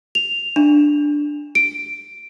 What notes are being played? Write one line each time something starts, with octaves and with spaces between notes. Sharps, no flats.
F7
D4
D7